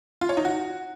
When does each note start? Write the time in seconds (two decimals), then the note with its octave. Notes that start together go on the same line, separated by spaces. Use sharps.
0.21 F4
0.29 C#5
0.37 D#4
0.45 F#4